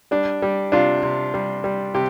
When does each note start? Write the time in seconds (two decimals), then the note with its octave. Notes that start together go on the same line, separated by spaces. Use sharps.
0.11 G3 D4
0.42 G3
0.72 C3 D4 F4
1.03 C3
1.34 G3
1.64 G3
1.95 C3 G4